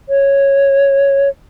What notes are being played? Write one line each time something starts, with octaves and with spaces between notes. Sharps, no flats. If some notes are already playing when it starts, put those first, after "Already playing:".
C#5